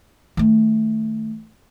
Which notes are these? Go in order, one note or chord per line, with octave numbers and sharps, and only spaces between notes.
D#3 A3